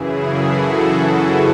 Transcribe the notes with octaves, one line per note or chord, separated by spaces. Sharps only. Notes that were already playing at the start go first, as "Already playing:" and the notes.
Already playing: F#2 C#3 E3 E4 G#4
F#4 A4